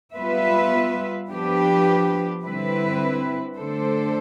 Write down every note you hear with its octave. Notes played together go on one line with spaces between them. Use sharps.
G3 B3 F4 B4 E5
F3 B3 D4 G4 B4
D3 G3 C4 E4 B4
D3 A3 D4 A4 C5